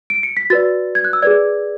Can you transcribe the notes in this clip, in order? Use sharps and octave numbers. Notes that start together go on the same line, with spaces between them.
D7
C#7
B6
F#4 B4 D5 A6
G#6
F#6
E6
G#4 B4 D5 G#6